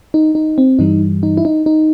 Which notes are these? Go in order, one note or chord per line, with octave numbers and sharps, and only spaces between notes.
D#4
D#4
C4
G2 E3 G3 D#4
D#4
E4
D#4
D#4